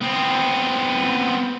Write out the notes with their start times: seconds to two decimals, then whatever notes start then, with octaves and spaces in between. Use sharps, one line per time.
0.02 B3 C4